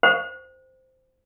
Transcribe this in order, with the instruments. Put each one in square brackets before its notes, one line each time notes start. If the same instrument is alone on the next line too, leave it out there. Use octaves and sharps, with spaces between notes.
[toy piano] C5